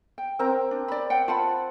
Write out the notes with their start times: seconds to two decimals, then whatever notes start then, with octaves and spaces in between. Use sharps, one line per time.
0.18 G5
0.39 C4 A#4 A#5
0.71 D4
0.88 D5 B5
1.10 F#5 G5
1.28 F4 F#5 A5 B5